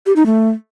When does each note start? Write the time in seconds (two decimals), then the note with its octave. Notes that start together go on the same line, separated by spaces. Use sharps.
0.06 G4
0.16 D#4
0.26 A3